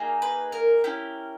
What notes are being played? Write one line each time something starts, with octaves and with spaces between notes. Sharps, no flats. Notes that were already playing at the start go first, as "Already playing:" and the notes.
Already playing: A#3 D#4 G#4
B4
A#4
C#4 E4 G4